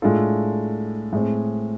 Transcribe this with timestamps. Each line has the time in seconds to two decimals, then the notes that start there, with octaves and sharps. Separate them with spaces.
0.02 A2 G#3 D4 F4 A4
1.13 A2 G#3 C4 G#4